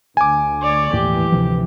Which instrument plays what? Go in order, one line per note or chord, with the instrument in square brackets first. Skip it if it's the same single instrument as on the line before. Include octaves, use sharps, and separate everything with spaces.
[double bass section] D2 [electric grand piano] G#5 D6
[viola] C#5 D5
[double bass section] G1 E3 [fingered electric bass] D#2 A2 [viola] G4
[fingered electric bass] D2 C3 F3